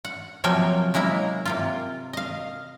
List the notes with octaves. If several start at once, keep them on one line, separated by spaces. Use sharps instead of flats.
F#5
C3 F3 F#3 A#3 G5 G#5
F#3 G#3 A#3 E4 A#5
C3 A#3 F4
D#5 F5